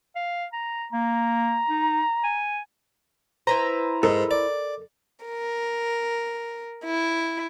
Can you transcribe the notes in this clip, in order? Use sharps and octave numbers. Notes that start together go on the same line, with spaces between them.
F5
A#5
A#3 A#5
D#4
G#5
E4 B4 C5 A#5
G#2 A4 A#4 D#5
D5
A#4
E4